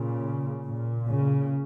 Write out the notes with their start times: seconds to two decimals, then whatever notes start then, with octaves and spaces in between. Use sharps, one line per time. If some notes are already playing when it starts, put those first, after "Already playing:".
Already playing: A#2 C#3
0.65 A#2
1.06 C#3